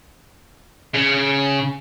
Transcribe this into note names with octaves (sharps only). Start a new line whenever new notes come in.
C#3